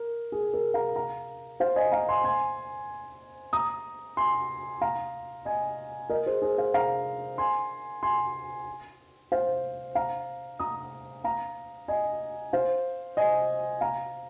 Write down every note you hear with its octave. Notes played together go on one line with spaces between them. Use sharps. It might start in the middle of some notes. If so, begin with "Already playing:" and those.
Already playing: A#4
G#4
A#4
F5 A#5
F5 A#5
C5 F5
D#5 G#5
F5 A#5
G#5 C6
G#5 C6
A#5 D#6
G#5 C6
F5 A#5
D#5 G#5
A#4 D#5
G#4 C5
G#4 C5
C5 F5
F5 A#5
G#5 C6
G#5 C6
C5 F5
F5 A#5
A#5 D#6
F5 A#5
D#5 G#5
C5 F5
D#5 G#5
F5 A#5